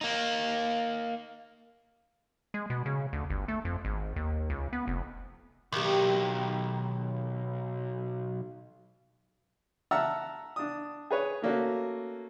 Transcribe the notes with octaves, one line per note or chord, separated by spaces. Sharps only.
A#3 D#4
G#3
B2
C#3
D2
G1
A3
F2
G#1
D#2
C#2
B3
F1
B1 D#3 G4
E5 F#5 A5 A#5 E6 F6
D4 D#6
G#4 B4 C#5
A3 A#3 C#4 F#4